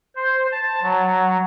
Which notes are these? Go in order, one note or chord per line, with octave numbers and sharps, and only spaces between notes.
C5
A5
F#3